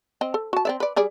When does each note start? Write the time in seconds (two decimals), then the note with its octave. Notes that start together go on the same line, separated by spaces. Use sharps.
0.21 C4 D#5
0.34 A4
0.53 F#4 A5
0.65 C4 D5 E5
0.80 B4 D5
0.96 G3 G#4 D5